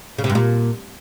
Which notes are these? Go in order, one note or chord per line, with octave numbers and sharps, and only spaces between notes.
C#3
C3
G2
A#2